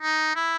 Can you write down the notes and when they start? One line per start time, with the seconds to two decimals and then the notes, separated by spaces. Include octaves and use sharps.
0.02 D#4
0.36 E4